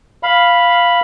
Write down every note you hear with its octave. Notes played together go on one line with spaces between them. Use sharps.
F5 B5